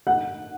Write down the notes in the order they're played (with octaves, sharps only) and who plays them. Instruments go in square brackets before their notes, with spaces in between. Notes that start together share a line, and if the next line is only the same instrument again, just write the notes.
[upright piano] F#5